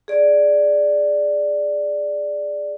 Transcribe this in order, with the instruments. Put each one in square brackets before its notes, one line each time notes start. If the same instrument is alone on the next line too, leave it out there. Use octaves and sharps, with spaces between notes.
[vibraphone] G#4 D5